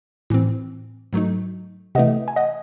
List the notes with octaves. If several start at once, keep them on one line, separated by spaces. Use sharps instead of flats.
A2 E3 C4
G#2 F#3 A3 D#4
C3 E3 A3 D#5 F#5
G#5
D#5 F#5